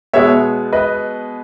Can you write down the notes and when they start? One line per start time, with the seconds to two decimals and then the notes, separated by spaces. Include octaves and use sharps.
0.13 B2 G#3 B3 C#5 E5
0.73 B4 D#5